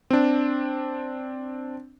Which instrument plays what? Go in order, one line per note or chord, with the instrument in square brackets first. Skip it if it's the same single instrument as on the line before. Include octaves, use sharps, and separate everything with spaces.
[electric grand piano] C4 D4